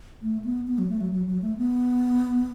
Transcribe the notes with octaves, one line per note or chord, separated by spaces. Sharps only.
A3
B3
B3
F#3
A3
F#3
F#3
F#3
A3
B3